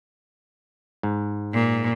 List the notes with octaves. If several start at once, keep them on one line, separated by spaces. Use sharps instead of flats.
G#2
A#2